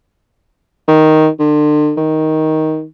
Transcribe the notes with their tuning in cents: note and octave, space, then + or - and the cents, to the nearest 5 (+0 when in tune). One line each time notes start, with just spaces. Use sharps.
D#3 +5
D3 +35
D#3 +10